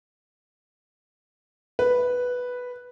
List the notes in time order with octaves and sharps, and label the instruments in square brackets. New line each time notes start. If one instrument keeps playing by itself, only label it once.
[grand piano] B4